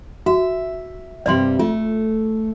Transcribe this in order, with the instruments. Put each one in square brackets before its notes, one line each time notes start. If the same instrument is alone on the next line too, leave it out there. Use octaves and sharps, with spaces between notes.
[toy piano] F#4 [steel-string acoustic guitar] E5
[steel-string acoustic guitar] G2 C3 G3 [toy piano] D5 C6
[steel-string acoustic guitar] A3 [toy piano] F4